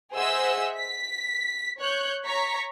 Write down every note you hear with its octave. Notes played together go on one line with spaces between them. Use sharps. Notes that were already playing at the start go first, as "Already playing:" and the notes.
G#4 C5 D#5 E5 F#5 E6
B6
C#5 F#6 G6
C#5 A#5 C#6 B6